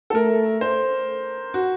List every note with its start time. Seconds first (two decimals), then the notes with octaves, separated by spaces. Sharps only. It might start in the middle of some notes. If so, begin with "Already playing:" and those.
0.10 A4
0.15 A3 A#4
0.61 C5
1.54 F#4